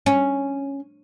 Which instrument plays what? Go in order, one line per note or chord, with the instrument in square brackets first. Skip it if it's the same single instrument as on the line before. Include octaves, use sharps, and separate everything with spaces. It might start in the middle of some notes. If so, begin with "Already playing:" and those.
[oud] C#4